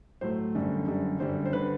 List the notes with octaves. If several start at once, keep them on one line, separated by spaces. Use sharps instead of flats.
A2 F#3 A3 C5
F#2 D3 G3
F#2 D3 G3
F#2 D3 G3 C5
C5
D3 G3 B4